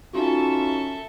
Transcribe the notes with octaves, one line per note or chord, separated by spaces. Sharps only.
C#4 D#4 F4 F#4 A4 E5